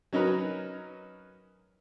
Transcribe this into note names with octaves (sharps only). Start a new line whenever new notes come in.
F#3 C#4 D#4 A#4 B4